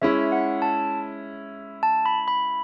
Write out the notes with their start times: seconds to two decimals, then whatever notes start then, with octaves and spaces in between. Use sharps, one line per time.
0.02 G#3 C#4 E4 E5
0.32 F#5
0.62 A5
1.83 A5
2.06 B5
2.28 B5